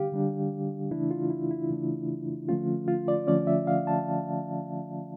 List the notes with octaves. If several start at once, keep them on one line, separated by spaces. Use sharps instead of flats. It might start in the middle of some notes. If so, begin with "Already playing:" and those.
Already playing: D3 G3 D4 G4 F5
D3 G3 D4
C#3 E3 A3 D4 E4
F4
E4
E4
C#3 E3 A3 D4
D3 F3 A3 C#4 F4
F4
D5
D3 F3 A3 C#4 D5
E5
F5
A5